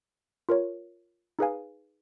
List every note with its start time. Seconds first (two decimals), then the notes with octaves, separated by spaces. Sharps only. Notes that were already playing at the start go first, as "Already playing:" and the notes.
0.49 F4 A#4 C#5
1.39 D#4 G#4 B4 F5 G#5